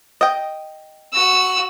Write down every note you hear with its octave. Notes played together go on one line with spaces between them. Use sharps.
D#5 G5
F#4 E6